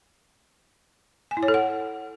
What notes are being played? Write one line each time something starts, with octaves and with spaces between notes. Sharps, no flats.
G#5
E4
C#5
A4
F#5